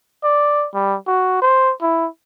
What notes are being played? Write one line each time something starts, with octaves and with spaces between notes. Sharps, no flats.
D5
G3
F#4
C5
E4